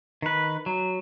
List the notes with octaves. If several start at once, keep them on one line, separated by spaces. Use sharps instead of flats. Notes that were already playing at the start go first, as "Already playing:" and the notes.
D#3 B4
F#3